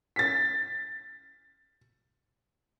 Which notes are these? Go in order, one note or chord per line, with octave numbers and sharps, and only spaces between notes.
A6 B6